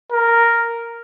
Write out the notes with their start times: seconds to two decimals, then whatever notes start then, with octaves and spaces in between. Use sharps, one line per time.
0.12 A#4